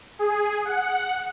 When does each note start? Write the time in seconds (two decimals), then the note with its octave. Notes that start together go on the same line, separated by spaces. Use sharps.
0.19 G#4
0.65 F#5